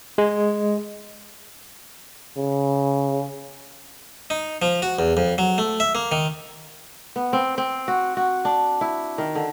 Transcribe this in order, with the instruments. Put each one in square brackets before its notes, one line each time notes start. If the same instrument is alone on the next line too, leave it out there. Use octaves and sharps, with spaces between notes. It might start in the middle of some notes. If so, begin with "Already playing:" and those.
[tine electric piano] G#3
[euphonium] C#3
[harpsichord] D#4
F3
F#4
E2
F2
F#3
A3
E5
A#3
D#3
[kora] B3
C4
C4
F#4
F#4
D4
E4
D#3
D3